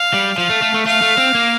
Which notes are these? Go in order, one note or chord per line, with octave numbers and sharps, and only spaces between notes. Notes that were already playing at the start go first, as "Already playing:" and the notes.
Already playing: F5
G3
F3 F5
A3
A3
A3
A3 F5
A3
C4
A#3